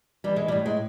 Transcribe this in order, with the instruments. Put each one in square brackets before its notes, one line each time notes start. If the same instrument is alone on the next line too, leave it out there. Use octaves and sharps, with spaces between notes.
[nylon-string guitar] E3 G3
G#3
G3
A2
G#3